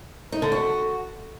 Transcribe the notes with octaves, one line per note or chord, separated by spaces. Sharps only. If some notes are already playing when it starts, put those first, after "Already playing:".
D#4
D3
F#4